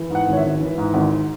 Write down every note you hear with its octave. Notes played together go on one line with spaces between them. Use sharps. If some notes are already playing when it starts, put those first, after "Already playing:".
Already playing: E3
G#2 F#5
G#1
C#5
E5
G#1
E3
G#2
G#1